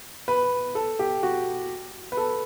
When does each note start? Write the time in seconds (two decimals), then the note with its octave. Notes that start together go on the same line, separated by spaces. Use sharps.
0.28 B4
0.75 A4
0.99 G4
1.23 F#4
2.12 B4
2.17 A4